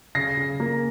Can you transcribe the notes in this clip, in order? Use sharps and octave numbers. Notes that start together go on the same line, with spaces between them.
C#3 A#6 C7
C#3
A#3